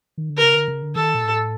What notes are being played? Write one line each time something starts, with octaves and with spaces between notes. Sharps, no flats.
D#3
D3
A#4
C#3
D3
C#3
D3
D#3 A4
A#2
A2